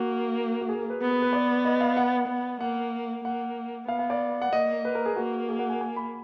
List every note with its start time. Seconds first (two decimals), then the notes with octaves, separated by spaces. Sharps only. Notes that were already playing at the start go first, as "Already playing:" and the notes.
Already playing: A#3 F#4
0.61 F#4
0.69 G#4
0.79 A#4
0.90 B4
1.01 B3
1.11 B4
1.22 B4
1.33 D5
1.65 D#5
1.81 F5
1.97 F#5
2.28 B3
2.61 A#3 F#5
3.24 A#3 F#5
3.88 B3 F5
3.99 F5
4.10 D5
4.42 F#5
4.52 A#3 D#5
4.85 B4
4.95 A#4
5.06 G#4
5.16 A#3 F#4
5.49 G#4
5.59 F#5
5.70 G#5
5.81 G#5
5.96 B5